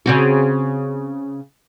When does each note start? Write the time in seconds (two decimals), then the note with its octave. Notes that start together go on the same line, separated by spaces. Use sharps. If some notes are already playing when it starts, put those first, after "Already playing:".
0.06 C#3 C4 F#4